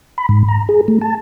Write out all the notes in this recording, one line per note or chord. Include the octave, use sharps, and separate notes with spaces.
B5
G#2
A#5
G#4
A3
A5